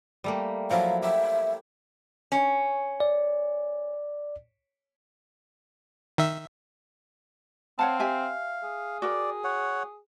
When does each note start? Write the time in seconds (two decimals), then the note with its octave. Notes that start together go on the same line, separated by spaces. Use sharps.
0.24 G3 A3 A#3
0.70 F3 F#3 E4 F5
1.02 G4 E5
2.32 C#4
3.00 D5
6.18 D#3 E5
7.79 C4 C#5 F5 F#5 A5
7.99 G4 E5 G#5
8.63 G#4
9.02 F#4 A#4 D5 G5
9.44 C#5 F#5